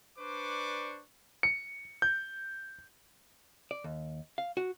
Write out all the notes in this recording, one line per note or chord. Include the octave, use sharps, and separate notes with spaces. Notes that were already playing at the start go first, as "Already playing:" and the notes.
D4 B4 C5 D5 C#6 D6
C#7
G6
D5
D#2
F5
F#4